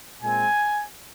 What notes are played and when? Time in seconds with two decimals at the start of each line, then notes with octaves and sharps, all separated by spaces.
0.22 A#2 G#3 C4 G#5